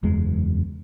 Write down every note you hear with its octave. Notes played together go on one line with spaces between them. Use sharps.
F#1 E2 G#3